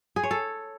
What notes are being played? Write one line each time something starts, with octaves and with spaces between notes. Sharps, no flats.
G#4
C#5
A4